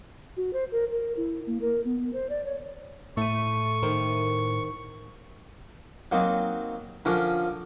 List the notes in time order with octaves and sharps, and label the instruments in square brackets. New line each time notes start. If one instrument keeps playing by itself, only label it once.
[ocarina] F#4
C5
A#4
A#4
E4
A#3
A#4
B3
C5
D5
C#5
[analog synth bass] A2 [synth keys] A3 D#7 [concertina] C#6
[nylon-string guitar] D#3 A#4 C5
[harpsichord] F#3 A#3 C4 D#4
D3 F3 C#4 D4 A#4